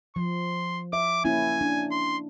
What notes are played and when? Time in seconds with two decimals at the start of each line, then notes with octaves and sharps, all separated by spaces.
0.16 F3 C6
0.93 E5 D6
1.25 A#3 C#4 E4 G#5
1.61 D4
1.91 C6